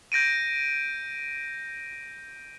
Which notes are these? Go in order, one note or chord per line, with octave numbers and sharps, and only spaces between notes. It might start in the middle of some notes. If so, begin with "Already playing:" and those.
G6 A#6 D7 D#7